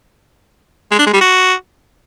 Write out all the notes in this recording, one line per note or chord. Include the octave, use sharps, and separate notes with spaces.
G#3
D4
G#3
G3
F#4